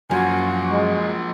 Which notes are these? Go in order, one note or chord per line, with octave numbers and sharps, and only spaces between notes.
F#2 F3 A#3 F#4 G#5
G#3